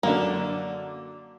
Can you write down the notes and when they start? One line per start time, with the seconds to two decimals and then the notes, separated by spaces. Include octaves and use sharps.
0.03 F#2 D3 A#3 D4